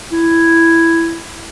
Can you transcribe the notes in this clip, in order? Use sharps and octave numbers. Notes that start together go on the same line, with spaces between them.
E4